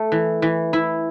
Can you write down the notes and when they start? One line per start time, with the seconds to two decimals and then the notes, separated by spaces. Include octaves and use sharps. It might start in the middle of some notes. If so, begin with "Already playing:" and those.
Already playing: A3
0.12 E3
0.42 E3
0.73 E4